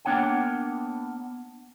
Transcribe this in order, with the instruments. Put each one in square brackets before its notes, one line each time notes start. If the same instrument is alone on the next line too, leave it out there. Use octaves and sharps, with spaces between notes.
[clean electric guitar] A#3 B3 D4 C#5 F#5 G5